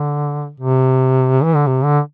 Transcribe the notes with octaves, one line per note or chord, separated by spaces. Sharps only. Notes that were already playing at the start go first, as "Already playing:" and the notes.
Already playing: D3
C3
E3
D3
C3
D3